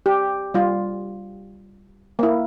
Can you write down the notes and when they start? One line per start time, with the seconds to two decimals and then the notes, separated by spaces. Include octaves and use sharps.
0.06 G4
0.54 G3 F4
2.19 A#3 E4